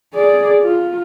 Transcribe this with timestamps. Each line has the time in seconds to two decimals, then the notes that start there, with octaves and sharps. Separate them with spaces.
0.14 G#4 D5
0.63 F4